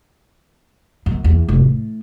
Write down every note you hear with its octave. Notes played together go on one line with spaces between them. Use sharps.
F#2
E2
F1
A2